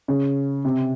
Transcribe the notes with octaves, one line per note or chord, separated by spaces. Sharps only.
C#3
C3